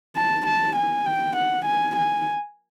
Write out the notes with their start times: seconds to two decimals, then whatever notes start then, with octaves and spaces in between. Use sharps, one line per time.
0.16 A5
0.47 A5
0.76 G#5
1.06 G5
1.37 F#5
1.66 G#5
1.96 G#5